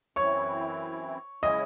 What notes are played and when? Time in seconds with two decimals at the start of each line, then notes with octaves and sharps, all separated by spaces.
0.16 F#2 E3 C4 E4 C#5 C#6
1.43 C#3 G#3 C#4 E4 D#5 D#6